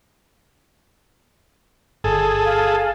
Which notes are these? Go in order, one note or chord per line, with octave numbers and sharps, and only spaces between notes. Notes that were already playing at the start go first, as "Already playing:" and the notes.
G1 G#4 A4
F5